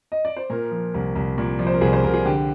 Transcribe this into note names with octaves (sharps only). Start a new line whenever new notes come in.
D#5
D5
C5
A#2 A#4
F3
C2
C2
A#2 D5
F3 D5
C5
A#4
C2 G#4
C5
C2 A#4
G#4
D3 G4